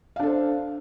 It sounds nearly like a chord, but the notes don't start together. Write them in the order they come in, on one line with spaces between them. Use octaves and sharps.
F5 D4 A4 C5